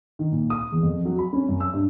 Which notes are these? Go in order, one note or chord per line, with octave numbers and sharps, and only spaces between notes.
D#3
A#2
D#6
E2
F2
F#3
B5
C#4
F#2
E6
G2